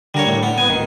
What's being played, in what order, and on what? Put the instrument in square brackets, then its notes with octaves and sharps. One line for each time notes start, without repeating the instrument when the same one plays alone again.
[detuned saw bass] D3 [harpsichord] G3 A#4 C#5
[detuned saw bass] A2
[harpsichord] B3
[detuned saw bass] B3 [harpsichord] G#5
[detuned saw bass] D1 [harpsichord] D#3